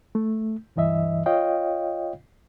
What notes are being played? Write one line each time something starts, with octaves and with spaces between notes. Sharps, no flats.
A3
C#2 G2 E3 D#5 E5
F4 C#5 D#5 F5 G5